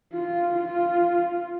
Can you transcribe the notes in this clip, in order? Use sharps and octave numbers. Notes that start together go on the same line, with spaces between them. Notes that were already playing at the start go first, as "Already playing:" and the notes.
F4
F4